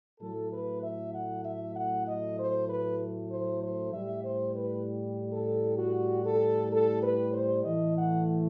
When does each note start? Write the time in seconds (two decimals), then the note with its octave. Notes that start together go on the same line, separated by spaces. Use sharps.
0.21 A2 F#3 A3 A4
0.52 B4
0.83 E5
1.14 F#5
1.45 E5
1.76 F#5
2.07 D#5
2.38 C5
2.69 B4
3.30 C5
3.62 C5
3.93 A2 G3 E5
4.24 C5
4.55 B4
5.33 A4
5.78 F#4
6.26 A4
6.72 A4
7.03 B4
7.34 C5
7.65 A2 E3 A3 D#5
7.96 F#5